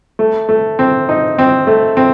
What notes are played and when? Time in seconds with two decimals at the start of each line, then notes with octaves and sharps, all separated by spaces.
0.19 A3
0.49 A3
0.79 C4
1.09 D#4
1.38 C4
1.67 A3
1.97 C4